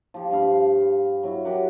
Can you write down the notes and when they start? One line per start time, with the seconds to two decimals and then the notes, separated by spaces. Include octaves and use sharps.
0.14 F3 G4
0.31 G2 F5 B5
1.23 F#3 E4
1.44 F#3 G4 A#4 F#5